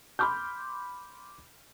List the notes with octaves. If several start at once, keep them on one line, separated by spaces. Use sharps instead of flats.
B5 C6 D6 F6 G6